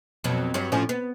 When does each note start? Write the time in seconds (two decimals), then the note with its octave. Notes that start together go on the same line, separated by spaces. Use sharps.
0.24 F2 B2 F#3
0.54 G2 F#3
0.72 A2 F3 C#4
0.89 B3